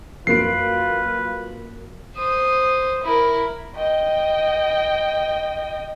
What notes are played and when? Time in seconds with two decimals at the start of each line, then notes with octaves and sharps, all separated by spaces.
0.27 F#2 A#3 F4 B4 C7 D7
2.16 C5 D#6
3.03 E4 A#4
3.76 D#5 G5